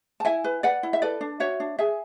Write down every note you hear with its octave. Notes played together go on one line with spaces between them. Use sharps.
A5
E4 E5 G#5
B4
B4 D5 F#5
E4
E5
A4 B4 D5
D4
F#4 C#5 E5
D4
G#4 E5 G#5